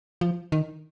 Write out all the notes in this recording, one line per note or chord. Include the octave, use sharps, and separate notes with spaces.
F3
D#3